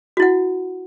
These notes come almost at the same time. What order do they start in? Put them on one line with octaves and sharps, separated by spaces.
F#4 E4 F#5